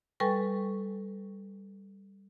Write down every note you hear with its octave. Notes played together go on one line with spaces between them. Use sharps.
G3 A4 B4 G5 G#5 C#6